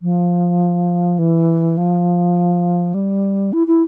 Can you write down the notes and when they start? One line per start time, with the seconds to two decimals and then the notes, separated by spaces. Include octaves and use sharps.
0.02 F3
1.18 E3
1.77 F3
2.94 G3
3.53 E4
3.67 E4